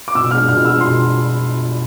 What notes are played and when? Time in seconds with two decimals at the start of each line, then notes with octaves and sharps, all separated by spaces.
0.08 D6
0.15 B2 E6
0.31 G#3 B3 D4 F6
0.48 B2 F6
0.64 G#3 B3 D4 E6
0.81 B2 C6